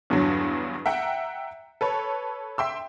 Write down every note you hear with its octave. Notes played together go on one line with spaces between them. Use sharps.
E2 G2 D3 F#3
E5 F#5 G5 A#5
A4 B4 C#5
E5 G5 C6 E6